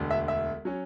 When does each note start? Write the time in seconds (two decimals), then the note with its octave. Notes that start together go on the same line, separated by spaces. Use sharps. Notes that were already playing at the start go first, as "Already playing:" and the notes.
Already playing: E1 D2 D3
0.11 E5
0.28 E5
0.65 F#3 C#4